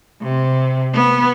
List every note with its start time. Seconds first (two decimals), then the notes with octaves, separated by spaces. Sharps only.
0.22 C3
0.94 B3